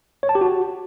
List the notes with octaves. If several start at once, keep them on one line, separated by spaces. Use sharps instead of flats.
C#5
A5
G4
F#4